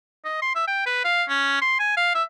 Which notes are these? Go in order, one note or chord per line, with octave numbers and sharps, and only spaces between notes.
D#5
C6
E5
G5
B4
F5
C#4
C6
G#5
F5
E5